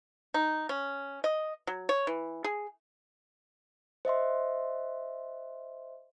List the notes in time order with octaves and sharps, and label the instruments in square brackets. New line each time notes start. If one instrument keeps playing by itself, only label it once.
[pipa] D#4
C#4
D#5
F#3
C#5
E3
G#4
[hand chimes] C5 D#5 E5 C6